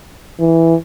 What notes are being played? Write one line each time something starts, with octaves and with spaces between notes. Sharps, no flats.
E3